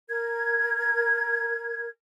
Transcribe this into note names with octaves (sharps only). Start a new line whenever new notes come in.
A#4 G#6